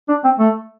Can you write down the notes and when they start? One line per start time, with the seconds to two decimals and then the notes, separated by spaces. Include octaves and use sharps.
0.09 D4
0.24 C4
0.39 A3